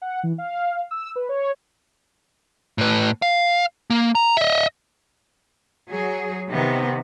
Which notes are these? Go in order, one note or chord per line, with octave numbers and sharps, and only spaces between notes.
F#5
E3
F5
E6
B4
C#5
A2 B4
F5
A#3
A#5
D#5 E5
F#3 G#4
C3 D#3 B3